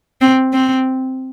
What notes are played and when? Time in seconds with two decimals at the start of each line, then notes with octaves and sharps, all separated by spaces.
0.21 C4
0.53 C4